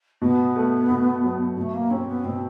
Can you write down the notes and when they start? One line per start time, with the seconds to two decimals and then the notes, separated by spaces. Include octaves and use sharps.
0.22 B2 B3
0.56 A3
0.89 B2
1.23 F#3
1.57 B2 A3
1.73 A#3
1.90 C4 C#4
2.08 B3
2.24 B2 C4